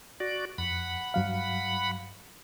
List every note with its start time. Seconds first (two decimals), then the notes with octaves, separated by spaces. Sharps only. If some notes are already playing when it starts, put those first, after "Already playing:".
0.20 F#4 D5
0.58 F2 F#5 B5
1.14 G2 F#3 F5